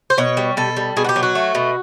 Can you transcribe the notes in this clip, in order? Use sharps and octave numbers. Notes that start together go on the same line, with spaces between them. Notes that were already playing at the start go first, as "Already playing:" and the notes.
C5
B2 C#5
G3
B2 A4
G3
B2 G#4
F#4
G4
F#3
F#4
A3
B2